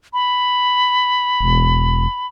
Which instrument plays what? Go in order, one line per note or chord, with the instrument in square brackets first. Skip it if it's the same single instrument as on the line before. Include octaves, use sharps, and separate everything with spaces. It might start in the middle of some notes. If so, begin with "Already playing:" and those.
[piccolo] B5
[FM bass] E1